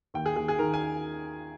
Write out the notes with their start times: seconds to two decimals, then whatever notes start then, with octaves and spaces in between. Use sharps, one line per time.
0.14 D#2 G5
0.26 G#4
0.36 D#2 G#4
0.48 G#4
0.59 D#3 A#4
0.74 G#5